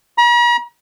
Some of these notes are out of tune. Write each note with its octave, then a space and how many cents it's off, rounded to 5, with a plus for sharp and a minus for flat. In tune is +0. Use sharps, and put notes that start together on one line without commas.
A#5 +45